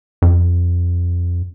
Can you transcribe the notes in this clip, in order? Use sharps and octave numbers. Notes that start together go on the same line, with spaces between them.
F2